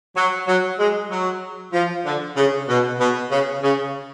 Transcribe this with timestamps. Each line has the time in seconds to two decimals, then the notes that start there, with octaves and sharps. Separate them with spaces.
0.16 F#3
0.47 F#3
0.79 G#3
1.10 F#3
1.73 F3
2.05 D3
2.37 C#3
2.69 B2
3.00 B2
3.31 C#3
3.63 C#3